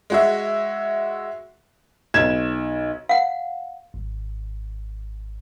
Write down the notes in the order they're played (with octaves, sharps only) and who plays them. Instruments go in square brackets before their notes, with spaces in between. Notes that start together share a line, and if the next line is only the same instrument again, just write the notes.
[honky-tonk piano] G#3 F#4 E5
[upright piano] B1 G#6 E7
[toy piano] F5 F#5
[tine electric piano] G#1